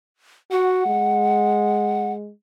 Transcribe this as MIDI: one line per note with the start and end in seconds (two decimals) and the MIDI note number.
0.52 0.83 66
0.52 2.12 78
0.86 2.31 56